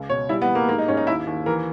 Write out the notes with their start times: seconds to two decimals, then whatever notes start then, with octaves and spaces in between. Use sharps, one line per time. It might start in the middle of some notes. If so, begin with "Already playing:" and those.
Already playing: C#2
0.09 B2 C#5
0.29 G3 E4
0.42 B3
0.49 G3
0.55 A#3
0.69 G#2 A#3
0.78 D#4
0.88 G#2 C#4
0.97 D#4
1.07 D#2 E4
1.27 D#2
1.46 E3 A#4